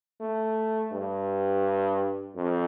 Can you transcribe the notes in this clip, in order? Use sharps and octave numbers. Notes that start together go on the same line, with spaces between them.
A3
G2
F2